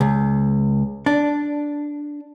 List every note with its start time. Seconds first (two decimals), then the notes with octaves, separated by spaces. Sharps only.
0.01 C#2
1.06 D4